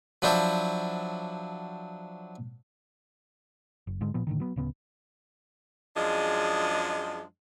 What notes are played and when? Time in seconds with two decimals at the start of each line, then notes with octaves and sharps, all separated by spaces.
0.22 F3 F#3 D4 E4 C5
3.87 F#1
4.01 G#2 D3 G#3
4.14 A#2 F3 B3
4.27 A2 D3 D#3
4.40 F#3 B3
4.56 D1 C#3 B3
5.96 F#2 F3 G#3 D4 G#4 D#5